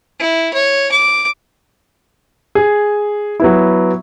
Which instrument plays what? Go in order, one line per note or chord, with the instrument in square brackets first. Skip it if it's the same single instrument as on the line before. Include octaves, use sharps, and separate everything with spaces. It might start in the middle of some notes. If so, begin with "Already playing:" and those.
[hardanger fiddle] E4
C#5
D6
[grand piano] G#4
F#3 B3 E4